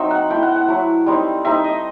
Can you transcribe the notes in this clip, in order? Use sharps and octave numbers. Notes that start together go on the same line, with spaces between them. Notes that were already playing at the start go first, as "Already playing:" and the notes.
Already playing: F#3 C4 D#4 E5
F#5
A3 E4 G5
F#5
F#5
F#3 A3 E4
G3 C4 D#4
G3 C4 D#4 E5
D#5